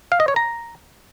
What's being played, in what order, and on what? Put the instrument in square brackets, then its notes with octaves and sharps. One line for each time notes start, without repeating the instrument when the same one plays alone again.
[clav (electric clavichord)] F5
D#5
C#5
A#5